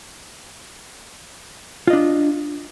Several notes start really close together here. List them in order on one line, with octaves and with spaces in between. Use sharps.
F4 D#5 D4